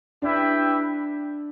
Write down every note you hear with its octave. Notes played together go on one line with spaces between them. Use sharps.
D4 E4 G4 B4 E5 G5